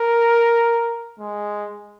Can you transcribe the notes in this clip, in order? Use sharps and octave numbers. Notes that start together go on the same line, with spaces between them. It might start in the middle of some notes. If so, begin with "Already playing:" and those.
Already playing: A#4
G#3